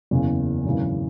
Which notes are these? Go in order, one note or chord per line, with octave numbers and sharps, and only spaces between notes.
F#1 E2 C#3 E3
G#1 F#2 C#3 E3